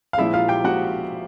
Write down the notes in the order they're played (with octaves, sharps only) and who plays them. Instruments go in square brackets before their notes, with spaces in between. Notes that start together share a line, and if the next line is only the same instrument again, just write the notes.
[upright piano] F5
A#1 A#2 F3 G#3 E4 E5
F4 F5
G4 G5
A#2 F3 G#3 F#4 F#5